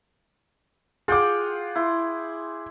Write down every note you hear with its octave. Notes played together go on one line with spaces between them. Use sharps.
F4 G#4 F#5 G5 D6
E4 C6